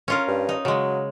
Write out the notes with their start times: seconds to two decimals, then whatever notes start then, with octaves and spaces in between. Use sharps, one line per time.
0.08 C#4 F4 A#4
0.28 G2
0.49 D#4
0.65 C#3 F#3 G#3